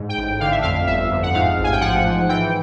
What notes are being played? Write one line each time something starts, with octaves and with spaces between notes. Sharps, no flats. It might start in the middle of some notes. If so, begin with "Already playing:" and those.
Already playing: G#2
G5
A1
D3 F5
E5
F2 F5
G1 E5
F2
F#5
G#2 F5
A1
G#5
G5
F3 F#5
G#2
E3 G5